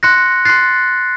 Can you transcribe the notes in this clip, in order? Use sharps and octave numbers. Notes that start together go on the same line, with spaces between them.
C6 F#6 A#6 C#7
C6 F#6 A6 C7